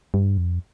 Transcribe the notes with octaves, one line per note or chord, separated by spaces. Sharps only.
G2
F2